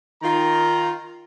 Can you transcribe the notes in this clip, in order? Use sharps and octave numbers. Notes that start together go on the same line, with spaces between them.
D#3 F4 A#5